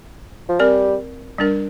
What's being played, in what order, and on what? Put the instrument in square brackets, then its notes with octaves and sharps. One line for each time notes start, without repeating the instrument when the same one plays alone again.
[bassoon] F3
[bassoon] G3 [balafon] C4 A#4 D5
[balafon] G3 D4 A#4